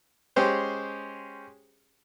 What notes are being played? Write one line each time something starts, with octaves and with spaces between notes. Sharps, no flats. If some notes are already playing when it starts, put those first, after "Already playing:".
G#3 C#4 G4 G#4 C5